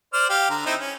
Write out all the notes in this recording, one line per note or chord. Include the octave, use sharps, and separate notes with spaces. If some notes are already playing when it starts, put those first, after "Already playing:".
C5 D5 F6
G4 F5
D3 A#5
C4 D#4 E4
C#4